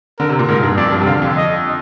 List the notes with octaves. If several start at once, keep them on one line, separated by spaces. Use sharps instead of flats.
D3 A#4
C3
A#2
G#2 A#4
G2
F2 D5
G2
C3
D3 F5
F2
D#5